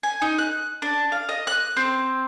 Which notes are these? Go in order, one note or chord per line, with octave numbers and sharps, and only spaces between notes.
G#5
D#4
F#6
D4
F5
D#5
F#6
C4